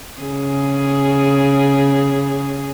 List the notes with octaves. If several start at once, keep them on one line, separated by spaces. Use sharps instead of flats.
C#3 G#4